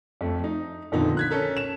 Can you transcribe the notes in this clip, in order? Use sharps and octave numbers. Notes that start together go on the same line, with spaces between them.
F2 A3
D#4
F2 A#2 D3 D#3 B3 D#4
F#6 G#6 B6
C#4 A4 A#4
E7